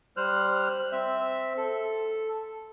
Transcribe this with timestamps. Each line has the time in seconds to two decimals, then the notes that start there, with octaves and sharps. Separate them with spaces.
0.17 G3 C5 F6 F#6
0.92 C4 E5
1.57 A4